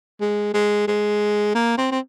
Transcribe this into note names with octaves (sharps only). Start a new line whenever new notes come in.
G#3
G#3
G#3
A#3
C4
C4